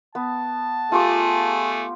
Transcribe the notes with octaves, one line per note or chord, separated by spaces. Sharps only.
B3 A5
A3 F4 G4 G#4 C#6